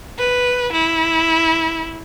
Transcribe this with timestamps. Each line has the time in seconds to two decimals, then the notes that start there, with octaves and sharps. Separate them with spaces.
0.18 B4
0.72 E4